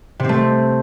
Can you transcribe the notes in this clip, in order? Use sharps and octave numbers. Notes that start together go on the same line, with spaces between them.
C3 A3 C4